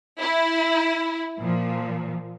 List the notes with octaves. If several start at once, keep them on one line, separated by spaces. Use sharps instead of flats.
E4
A#2 F3